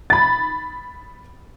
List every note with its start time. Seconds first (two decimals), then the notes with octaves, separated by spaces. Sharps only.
0.10 B5 A6